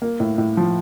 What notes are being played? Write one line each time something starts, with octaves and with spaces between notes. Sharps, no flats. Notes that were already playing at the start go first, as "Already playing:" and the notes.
A#3
A2
A2
F3